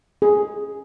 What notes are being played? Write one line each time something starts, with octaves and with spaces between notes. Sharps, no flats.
G#4